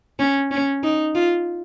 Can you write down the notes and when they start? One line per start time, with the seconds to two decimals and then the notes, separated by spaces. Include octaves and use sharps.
0.19 C#4
0.51 C#4
0.83 D#4
1.15 F4